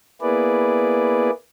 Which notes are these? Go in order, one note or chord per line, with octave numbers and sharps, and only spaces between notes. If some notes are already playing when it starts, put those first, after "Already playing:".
A#3 B3 E4 G#4 B4 D5